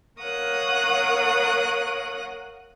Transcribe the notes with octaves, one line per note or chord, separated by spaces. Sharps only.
A#4 C#5 F5 F#5 D#6 F#6